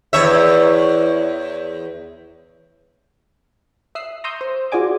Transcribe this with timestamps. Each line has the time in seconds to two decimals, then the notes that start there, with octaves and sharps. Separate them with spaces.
0.13 E2 C#5 E5
3.95 E5 D#6 E6 F#6 C7
4.24 A#5 C6 C#6 D#6 E6 G6
4.41 C5
4.72 F4 F#4 G#4 D5 G#5 D6